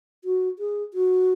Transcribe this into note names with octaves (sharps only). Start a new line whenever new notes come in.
F#4
G#4
F#4